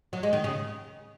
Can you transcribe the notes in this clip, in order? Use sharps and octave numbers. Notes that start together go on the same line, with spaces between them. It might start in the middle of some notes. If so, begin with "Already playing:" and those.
F#3
G#3
D#3
C#3